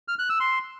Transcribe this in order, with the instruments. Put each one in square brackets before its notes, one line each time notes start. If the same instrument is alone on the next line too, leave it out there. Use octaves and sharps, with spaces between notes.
[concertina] F6
F#6
E6
C6